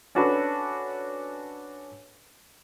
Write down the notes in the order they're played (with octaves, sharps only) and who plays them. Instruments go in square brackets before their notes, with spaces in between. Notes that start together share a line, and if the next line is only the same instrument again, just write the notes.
[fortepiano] C#4 D4 F#4 A4 B4